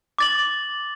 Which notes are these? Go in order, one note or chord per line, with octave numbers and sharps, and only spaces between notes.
D6 A6 F#7